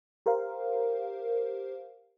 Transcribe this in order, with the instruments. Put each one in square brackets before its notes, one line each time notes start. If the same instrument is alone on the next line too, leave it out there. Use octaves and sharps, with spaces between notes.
[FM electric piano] G4 A#4 C5 F5